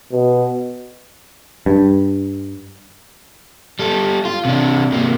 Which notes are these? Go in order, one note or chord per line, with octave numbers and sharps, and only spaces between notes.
B2
G2
G3 A4
F4
C3 D4
C3 A#3